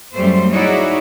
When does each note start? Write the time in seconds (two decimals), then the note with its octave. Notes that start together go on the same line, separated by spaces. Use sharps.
0.14 F#2 G3 A3 C5
0.51 D#4 E4 F#4 G#4 C#5 D5